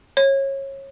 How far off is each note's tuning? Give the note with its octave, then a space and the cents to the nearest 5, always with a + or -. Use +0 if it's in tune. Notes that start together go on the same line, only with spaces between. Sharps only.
C#5 -25